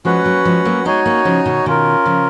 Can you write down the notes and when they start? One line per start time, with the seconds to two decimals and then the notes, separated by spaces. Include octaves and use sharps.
0.05 F3 G#3 C#4 F#4 B4 F#5
0.25 F#3 A#3
0.45 F3 G#3
0.65 F#3 A#3
0.85 G#3 B3 D#4 F#4 C#5 G#5
1.06 A#3 C#4
1.25 C#3 F3
1.46 B2 D#3
1.66 B2 D#3 C#4 F4 A#4
2.06 C#3 F3